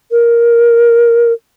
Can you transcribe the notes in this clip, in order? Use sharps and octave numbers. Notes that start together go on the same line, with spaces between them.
A#4